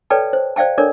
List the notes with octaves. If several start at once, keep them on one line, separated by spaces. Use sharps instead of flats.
A4 B4 C#5 D5 G5 A5
C5
C5 D5 F5 G5 A5
D4 A4 A#4 C#5 D5